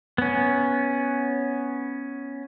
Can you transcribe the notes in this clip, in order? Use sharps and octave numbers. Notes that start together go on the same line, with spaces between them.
B3 C#4